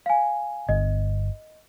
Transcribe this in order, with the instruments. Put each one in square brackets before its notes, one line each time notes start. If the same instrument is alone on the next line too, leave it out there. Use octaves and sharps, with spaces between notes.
[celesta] F5 G#5
[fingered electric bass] G1 [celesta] D#5